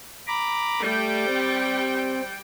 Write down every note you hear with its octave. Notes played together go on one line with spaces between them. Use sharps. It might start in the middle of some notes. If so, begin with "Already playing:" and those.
A#5 B5 D6
G3 A3 G5
C4